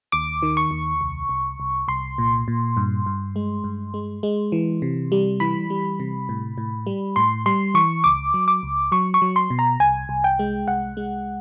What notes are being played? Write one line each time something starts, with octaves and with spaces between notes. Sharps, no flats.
D#2 D6
D#3
C#6
D#2
C2
C2
C2
C2 C6
A#2
A#2
G2
G2
G#3
G2
G#3
G#3
E3
C3
G3
E3 B5
G3
C3
A2
A2
G3
A2 C6
G3 C6
E3 C#6
C#2 D6
F#3
D6
C#2
F#3 C#6
C#6
F#3
C6
B2
A#5
C2 G#5
C2
G5
G#3
C2 F#5
G#3